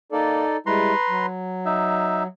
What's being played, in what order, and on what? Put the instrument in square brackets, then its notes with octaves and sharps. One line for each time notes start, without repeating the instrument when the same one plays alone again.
[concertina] A#3 [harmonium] D#4 A4 D5
[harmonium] G3 G#3 E4 [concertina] B4 A#5 C6
[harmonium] F#3
[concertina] D#4 E5